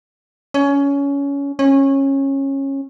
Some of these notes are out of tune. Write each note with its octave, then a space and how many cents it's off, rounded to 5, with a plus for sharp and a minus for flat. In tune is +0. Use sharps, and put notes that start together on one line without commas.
C#4 +20
C#4 -20